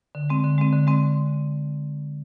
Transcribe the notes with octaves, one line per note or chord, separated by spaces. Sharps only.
D3
G#3 C4
D3
G#3 C4
D3
G#3 C4